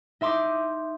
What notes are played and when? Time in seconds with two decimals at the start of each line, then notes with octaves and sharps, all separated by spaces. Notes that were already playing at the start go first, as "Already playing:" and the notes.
0.21 D#4 E5 C6 D6 G6